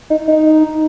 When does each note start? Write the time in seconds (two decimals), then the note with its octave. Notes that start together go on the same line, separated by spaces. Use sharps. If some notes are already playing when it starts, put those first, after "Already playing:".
0.10 D#4
0.28 D#4